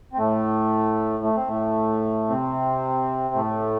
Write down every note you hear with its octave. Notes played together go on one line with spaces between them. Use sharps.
C4
A2 A3
A3
C4
A2 A3
C3 C4
A2 A3